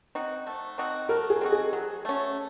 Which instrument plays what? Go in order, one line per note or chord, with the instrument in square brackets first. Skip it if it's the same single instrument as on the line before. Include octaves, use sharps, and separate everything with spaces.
[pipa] C4 D#4 F#4
A3
C4 D#4 F#4
[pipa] A3 [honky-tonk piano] A#4
[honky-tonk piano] G#4
[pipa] C4 D#4 F#4
[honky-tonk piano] G#4
[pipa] F#3
A3 C#4